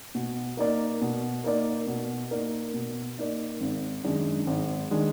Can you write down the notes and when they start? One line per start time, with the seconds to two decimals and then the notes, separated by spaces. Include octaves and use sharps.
0.15 B2
0.57 A#3 D#4 A#4 D5
1.01 B2
1.44 A#3 D#4 A#4 D5
1.87 B2
2.31 A#3 D#4 A#4 D5
2.74 B2
3.18 A#3 D#4 A#4 D5
3.61 G#1
4.04 F#2 D#3 G#3 D4
4.47 G#1
4.91 D#3 G#3 D4